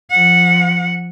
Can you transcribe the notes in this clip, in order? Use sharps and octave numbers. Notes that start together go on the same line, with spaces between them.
F3 F#5